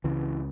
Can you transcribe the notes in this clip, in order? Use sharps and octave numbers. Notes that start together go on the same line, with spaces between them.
C#2 C#3 E3